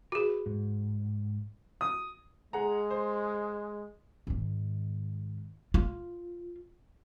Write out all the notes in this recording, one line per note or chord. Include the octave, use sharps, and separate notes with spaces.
F#4 G#4 A#4 B4
G#2
D#6
G#3 G#4 F#5 A#5
C5
G#2 D#3
F4